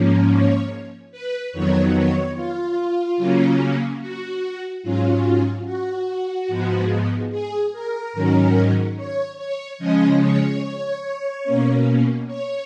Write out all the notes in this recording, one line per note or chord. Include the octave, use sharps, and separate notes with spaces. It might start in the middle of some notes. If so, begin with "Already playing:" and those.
Already playing: G#2 F3 A#3 C#4
C#5
B4
F2 D#3 F#3 B3 C#5
C#5
F4
C#3 F#3 A#3 C#4
F#4
G#2 F#3 C#4 F4
F#4
G#2 F3 G#3 B3
G#4
A#4
G#2 D#3 F#3 C#4
C#5
C#5
C#3 F3 G#3 C#4 D#5
C#5
B2 A#3 C#4
C#5